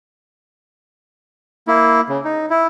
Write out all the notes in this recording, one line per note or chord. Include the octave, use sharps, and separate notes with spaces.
A#3 E4
C#3
D#4
E4